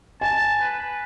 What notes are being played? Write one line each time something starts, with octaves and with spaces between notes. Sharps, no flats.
G#5 A5
B4